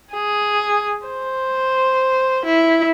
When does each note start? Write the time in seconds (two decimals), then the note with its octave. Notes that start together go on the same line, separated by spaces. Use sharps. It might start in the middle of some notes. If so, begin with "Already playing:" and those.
0.14 G#4
1.06 C5
2.46 E4